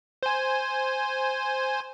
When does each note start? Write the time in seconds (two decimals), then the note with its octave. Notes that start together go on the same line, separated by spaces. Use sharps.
0.23 C5 G#5